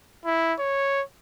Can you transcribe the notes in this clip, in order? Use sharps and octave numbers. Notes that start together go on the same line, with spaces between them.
E4
C#5